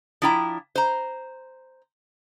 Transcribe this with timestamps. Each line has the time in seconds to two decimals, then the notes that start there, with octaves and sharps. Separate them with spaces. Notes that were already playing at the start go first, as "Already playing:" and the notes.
0.22 F3 D4 E4 G5 A#5
0.76 C5 A#5